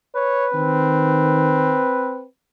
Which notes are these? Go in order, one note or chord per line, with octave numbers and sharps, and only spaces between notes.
B4 C#5
D#3 C4